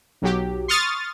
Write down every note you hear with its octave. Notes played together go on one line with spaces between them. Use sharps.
B1 F#3 G4
C6 C#6 D#6 F6 A6